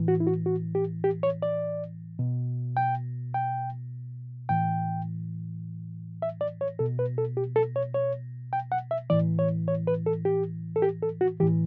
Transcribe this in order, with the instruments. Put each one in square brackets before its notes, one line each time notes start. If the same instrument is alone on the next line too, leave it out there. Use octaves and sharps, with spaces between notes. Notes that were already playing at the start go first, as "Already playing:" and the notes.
Already playing: [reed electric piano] A2 E3
F#4
E4
F#4
F#4
G4
G4
C#5
D5
B2
G5
G5
A2 E3 G5
E5
D5
C#5
B2 A4
B4
A4
G4
A4
C#5
C#5
G5
F#5
E5
A2 E3 D5
C#5
C#5
B4
A4
G4
A4
G4
A4
F#4
E3 G4
A2